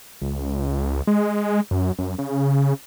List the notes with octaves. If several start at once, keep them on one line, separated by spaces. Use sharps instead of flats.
C#2
G#3
F#2
F#2
C#3